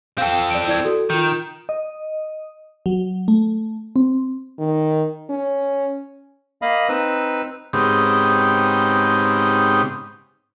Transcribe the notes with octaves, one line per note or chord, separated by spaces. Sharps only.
C4 A4 F5 G5
D5 D7
E4 D5 G#6
F#4 A4
D#3 F4 G6
D#5
F#3
A3
C4
D#3
C#4
A#3 D#5 F5 B5 D#6
C4 D#4 B4 E6
G#2 C#3 B3 C4 D#4 G4